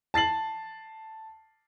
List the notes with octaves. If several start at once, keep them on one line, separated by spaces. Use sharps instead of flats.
A5 A6 C7 F#7